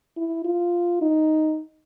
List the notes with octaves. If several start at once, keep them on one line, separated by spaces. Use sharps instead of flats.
E4
F4
D#4